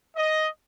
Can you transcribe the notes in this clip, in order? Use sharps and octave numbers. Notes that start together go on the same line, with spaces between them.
D#5